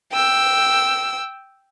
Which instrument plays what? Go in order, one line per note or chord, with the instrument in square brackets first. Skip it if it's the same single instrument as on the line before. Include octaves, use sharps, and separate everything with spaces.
[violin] G5 E6